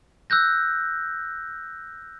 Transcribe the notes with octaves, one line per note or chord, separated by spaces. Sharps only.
E6 F#6 G6 A#6